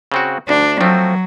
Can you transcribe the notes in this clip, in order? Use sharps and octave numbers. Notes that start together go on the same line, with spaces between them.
C#3 C4 F#4
D2 D4
F3 F#3 A3 C4